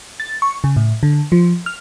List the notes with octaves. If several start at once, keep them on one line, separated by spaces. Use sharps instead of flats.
A6
C#6
C#3
A2
D3
F3
F6